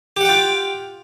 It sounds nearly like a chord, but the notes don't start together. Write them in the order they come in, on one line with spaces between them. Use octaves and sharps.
G4 F#5 G5 F4